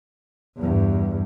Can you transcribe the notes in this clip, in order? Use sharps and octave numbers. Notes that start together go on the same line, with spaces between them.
E2 G2